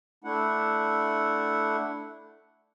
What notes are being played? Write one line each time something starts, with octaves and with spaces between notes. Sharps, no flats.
A3 D4 E4 F#5